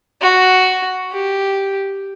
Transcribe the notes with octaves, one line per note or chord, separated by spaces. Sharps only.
F#4
G4